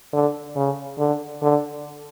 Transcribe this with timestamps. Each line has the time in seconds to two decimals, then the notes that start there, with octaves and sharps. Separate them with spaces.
0.13 D3
0.56 C#3
0.99 D3
1.42 D3